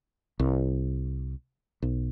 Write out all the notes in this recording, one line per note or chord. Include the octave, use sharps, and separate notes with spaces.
C2
B1